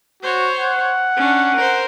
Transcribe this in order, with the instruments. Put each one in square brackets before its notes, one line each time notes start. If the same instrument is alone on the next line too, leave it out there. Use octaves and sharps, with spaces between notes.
[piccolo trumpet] F#4 [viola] C5 C#5
[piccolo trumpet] F#5
[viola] C#4 D4
A#4 C5